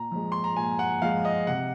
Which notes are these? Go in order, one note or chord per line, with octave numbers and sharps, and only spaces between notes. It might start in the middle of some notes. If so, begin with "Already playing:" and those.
Already playing: A#2 A#5
F3 G#3
C6
A#5
A#2 G#5
F#5
F3 G#3 F5
D#5
C3 F#5